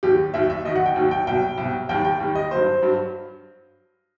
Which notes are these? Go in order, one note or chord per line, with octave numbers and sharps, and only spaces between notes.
D#2 D#3 F#3 G4
D#2 D#3 F#3 E5
E5
D#2 D#3 F#3 D#5
F#5
G5
D#2 D#3 F#3
G5
C2 B2 F#3 G5
C2 B2 F#3
D#2 D#3 G3 G5
G5
D#2 D#3 G3
D#5
G2 F#3 C5
G2 F#3